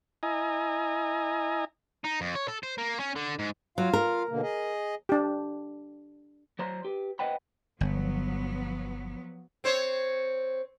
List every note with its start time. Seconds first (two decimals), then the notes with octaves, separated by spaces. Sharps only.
0.23 E4 D#5 G#5 A#5
2.04 D#4
2.21 F2
2.35 C#5
2.48 A4
2.63 C5
2.78 A#3
3.00 C#4
3.16 D3
3.39 G#2
3.78 F#3 F4 F5
3.93 A#4
4.29 B2 D3 A#3
4.43 G#4 D#5
5.09 D4 G4
6.59 F#3 C5 A#5 C6
6.85 G4 B4
7.19 B4 C5 D#5 F#5 G5 B5
7.81 G1 F3 F#3 B3
9.64 C4 C5 C#5